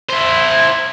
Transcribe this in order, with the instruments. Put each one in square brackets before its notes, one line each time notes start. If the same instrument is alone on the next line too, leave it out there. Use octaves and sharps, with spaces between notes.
[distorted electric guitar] E4 C5